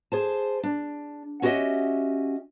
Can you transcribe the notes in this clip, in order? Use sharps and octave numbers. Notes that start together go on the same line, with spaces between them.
G#4 C5 A5
D4
C#4 F#4 G4 B4 D#5 E5